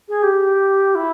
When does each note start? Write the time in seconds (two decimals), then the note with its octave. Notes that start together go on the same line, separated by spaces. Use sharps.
0.09 G#4
0.23 G4
0.95 E4